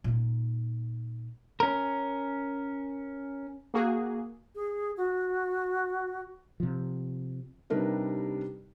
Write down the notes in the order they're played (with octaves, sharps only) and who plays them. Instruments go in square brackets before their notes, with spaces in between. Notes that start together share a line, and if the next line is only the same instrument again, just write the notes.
[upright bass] A#2 D#4
[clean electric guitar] C#4 A#4
[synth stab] A#3 F#4 G#4
[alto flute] G#4
F#4
[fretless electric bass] C3 F3
[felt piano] C3 G3 D4 D#4 A#4 B4